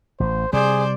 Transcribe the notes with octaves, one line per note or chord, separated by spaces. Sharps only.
A1 C5
C3 G3 G#4 C5 D5